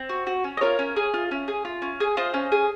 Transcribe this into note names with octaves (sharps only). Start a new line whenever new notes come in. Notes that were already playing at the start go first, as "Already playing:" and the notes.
Already playing: C4
F#4
F#4
C#4
D#5
F4 A#4 C#5
C#4
G#4
F4
C#4
G#4
F4
C#4
G#4
F4 C5 D#5
C#4
G#4